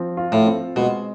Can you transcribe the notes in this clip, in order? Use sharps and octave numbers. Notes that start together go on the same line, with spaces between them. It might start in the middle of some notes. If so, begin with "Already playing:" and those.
Already playing: F3 C4
F4
A2
C4
B2 G#3